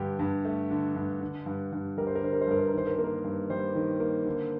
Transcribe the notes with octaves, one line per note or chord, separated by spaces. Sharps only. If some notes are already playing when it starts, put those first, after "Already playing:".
Already playing: G2 D3 G4
G2
A3
D3
G2
D3
G2
G2
G3 A#4
C5
A#4
D3 C5
A#4
C5
G2 A#4
C5
A#4
D#3 C5
A#4
A#3 C5
A#4
G2
G3 C5
D#3
A#3
D3